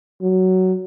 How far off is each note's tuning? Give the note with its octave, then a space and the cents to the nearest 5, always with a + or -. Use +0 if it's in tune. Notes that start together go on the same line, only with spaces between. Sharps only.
F#3 +10